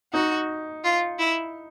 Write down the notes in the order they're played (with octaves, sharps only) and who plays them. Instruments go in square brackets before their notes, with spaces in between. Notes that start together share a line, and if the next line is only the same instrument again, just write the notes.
[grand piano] D#4 [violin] F#4
[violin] F4
E4